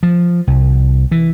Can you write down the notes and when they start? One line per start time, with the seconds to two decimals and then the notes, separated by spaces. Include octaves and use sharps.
0.03 F3
0.47 C2
1.12 E3